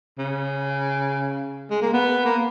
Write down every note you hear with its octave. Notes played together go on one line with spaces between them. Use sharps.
C#3
G#3
A#3
B3
A#3